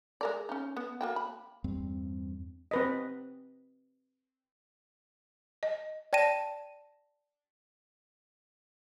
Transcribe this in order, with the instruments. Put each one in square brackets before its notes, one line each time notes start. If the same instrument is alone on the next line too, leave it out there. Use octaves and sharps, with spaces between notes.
[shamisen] G#3 A#4 D5
C#4 D#4
B3
A#3 F#4 G5
B5
[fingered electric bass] E2 G2 C4
[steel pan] C4 B4 D#5
[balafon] D#5
[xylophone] D5 G5 A5 A#6 D#7 E7